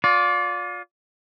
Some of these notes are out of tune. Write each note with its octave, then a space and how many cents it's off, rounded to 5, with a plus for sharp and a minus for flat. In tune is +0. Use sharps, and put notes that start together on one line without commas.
F4 +30 D5 -25